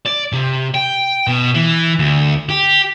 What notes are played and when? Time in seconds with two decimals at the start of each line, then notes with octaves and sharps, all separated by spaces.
0.06 D5
0.32 C3
0.74 G5
1.27 B2
1.54 E3
1.99 D2
2.49 G4